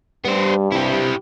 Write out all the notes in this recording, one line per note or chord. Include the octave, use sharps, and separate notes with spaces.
G2 G3 B3 C5
C3 E4 G4